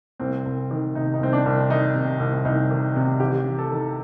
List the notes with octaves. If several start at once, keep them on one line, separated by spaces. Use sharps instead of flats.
C2 C4
C2
D#3
C3 D#4
D#4
C2 C4
D4
C2
D#3 D#4
C3
C2
C2 D#4
D#3
C3
A1 G4
A1
A4
D#3